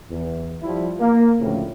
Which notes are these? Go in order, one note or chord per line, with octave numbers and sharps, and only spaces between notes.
E2
F3 G3 E4
A#3
D2 A2 C#3 F3